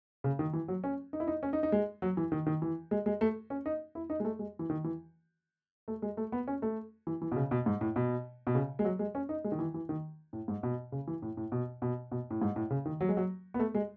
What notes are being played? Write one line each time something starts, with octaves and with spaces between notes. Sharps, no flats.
C#3
D#3
E3
F#3
C#4
D#4
E4
D#4
C#4
D#4
D#4
G#3
F#3
E3
D#3
D#3
E3
G#3
G#3
A3
C#4
D#4
E4
D#4
G#3
A3
G#3
E3
D#3
E3
A3
G#3
A3
B3
C#4
A3
E3
E3
B2
C#3
B2
G#2
A2
B2
B2
C#3
G#3
F#3
G#3
C#4
D#4
G#3
D#3
E3
E3
D#3
A2
G#2
B2
C#3
E3
A2
A2
B2
B2
B2
A2
G#2
A2
C#3
D#3
F#3
G#3
F#3
B3
A3
G#3